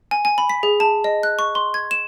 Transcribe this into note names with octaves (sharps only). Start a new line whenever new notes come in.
G#5
G#5
B5
B6
G#4
A5
D#5
F#6
C#6
C6
G#6
E7